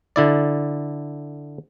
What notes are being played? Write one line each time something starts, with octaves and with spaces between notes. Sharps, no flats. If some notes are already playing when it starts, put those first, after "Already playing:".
D3 E4 D5